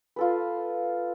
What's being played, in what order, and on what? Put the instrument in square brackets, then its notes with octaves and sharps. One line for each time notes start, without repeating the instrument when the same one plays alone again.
[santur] F4 A4 B4